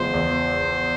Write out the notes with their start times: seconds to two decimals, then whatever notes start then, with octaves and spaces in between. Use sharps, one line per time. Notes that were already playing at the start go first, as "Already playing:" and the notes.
Already playing: E2 C#3 F3 G#3 C5
0.14 E2